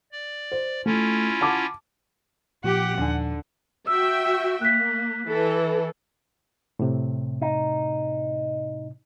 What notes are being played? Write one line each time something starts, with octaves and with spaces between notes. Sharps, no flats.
D5
C5
A3 C#4 E4 F4
F#5 A5 D6
A#2 F3 G4 F#5
D#2 D3 D4 G#5
F#4 E5 G5 E6
A#3 F#6 B6
E3 A4
A2 C3
D#4